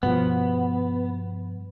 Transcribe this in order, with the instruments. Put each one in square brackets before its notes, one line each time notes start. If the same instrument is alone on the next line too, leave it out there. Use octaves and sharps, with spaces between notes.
[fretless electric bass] G2 B2 F3 [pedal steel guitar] B3